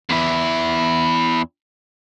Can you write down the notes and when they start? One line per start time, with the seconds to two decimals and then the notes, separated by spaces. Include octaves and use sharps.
0.09 E2 E4